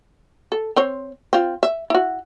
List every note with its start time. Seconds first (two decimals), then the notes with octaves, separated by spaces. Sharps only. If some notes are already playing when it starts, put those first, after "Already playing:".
0.52 A4
0.76 C4 C5 C#5
1.33 C4 F4
1.63 E5
1.90 E4 F#4